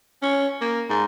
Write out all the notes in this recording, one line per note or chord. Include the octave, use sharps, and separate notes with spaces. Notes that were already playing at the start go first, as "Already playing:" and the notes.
C#4
A#3
G#2